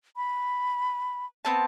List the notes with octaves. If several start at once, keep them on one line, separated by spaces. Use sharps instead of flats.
B5
B3 C4 A5